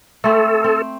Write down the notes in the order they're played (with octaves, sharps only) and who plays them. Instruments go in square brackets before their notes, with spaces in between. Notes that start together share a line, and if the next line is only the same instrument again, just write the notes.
[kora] A3 C4 [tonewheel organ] A4
[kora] C4